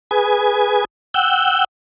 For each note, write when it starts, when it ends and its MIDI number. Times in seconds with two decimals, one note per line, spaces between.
0.11 0.85 68
0.11 0.85 71
0.11 0.85 80
1.14 1.64 78
1.14 1.64 79
1.14 1.64 88
1.14 1.64 90
1.14 1.64 91